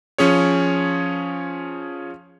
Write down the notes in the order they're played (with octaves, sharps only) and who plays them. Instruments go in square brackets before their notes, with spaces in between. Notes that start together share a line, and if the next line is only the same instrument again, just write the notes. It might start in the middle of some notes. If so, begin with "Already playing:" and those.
[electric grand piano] F3 C#4 G#4 C#5